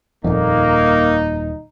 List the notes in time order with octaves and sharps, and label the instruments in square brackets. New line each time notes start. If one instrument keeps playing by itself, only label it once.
[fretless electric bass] D#1 A#2 [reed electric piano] F2 [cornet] A#3 [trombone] D#4